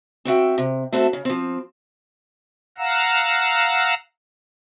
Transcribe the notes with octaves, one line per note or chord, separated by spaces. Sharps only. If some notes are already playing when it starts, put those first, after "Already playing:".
C4 F#4 E5 G5
C3
A3 C4 F#4 A4 E5
C#3
F3 C4
F5 F#5 A#5 E6